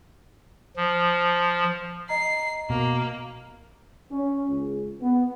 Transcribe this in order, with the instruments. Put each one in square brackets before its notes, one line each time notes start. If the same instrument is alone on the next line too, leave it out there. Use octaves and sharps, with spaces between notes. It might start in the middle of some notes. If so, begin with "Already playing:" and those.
[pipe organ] F3
[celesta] D#5 A#5 [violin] C7
[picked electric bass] B2 [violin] A#3
[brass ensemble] C#4
C#2
B3